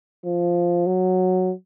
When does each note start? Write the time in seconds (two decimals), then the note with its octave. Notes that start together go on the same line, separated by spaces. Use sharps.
0.25 F3
0.87 F#3